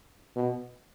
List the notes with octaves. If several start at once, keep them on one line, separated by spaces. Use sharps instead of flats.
B2